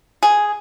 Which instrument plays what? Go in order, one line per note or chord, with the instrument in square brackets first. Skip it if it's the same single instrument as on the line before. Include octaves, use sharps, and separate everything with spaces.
[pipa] G#4